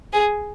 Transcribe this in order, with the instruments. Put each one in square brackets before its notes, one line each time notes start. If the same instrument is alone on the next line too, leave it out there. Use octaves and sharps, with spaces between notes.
[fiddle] G#4